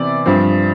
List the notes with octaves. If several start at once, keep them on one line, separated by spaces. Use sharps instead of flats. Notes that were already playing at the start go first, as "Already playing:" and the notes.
Already playing: C3 E3 B3 D5
G2 F3 C4